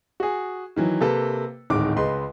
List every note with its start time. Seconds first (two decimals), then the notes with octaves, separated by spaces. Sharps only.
0.20 F#4 G#4
0.76 D#3 E3 F#3
1.01 C3 A#3 A4 B4
1.70 D1 G#2 D#3 D6
1.96 C#2 G#3 B4 C6